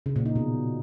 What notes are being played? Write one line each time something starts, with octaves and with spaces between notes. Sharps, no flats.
C#3
A#2
D#4
B2